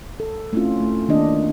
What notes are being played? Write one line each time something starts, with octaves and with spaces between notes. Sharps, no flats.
A4
A3 C4 C#4 E4 F4
A3
D#3 A#3 D4 D#5